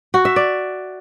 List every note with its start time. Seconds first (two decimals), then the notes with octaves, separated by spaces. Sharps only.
0.14 F#4
0.25 E5
0.36 D5